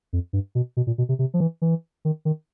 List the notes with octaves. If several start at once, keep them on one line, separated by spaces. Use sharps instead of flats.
F2
G2
B2
B2
A#2
B2
C3
C3
F3
E3
E3
D#3
D#3